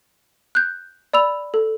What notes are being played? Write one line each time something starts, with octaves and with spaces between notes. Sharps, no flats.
F#6 G6
D5 B5 E6 F7
A4